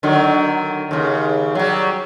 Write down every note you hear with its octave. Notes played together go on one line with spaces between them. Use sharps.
D3 D#3 F#3
D#2 C#3
F#3 G3